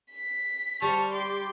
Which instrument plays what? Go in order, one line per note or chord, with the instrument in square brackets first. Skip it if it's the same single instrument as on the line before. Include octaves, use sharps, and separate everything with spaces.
[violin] B6
[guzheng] G3 [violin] C5 F6 [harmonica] A5 C#6
[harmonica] G4 [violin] C6 D6